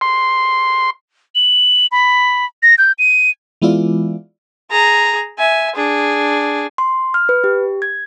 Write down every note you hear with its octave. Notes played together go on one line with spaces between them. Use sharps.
C6
F#7
B5
A#6
G6
D#7
E3 G#3 B3 E4 F4 D5
G#4 A#5
E5 G#5
D4 G#4
C6
F6
B4
G4
G#6